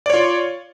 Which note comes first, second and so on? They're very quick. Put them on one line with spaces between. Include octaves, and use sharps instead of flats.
D5 C#5 F4